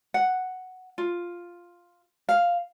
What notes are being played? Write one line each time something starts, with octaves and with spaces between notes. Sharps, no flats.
F#5
F4
F5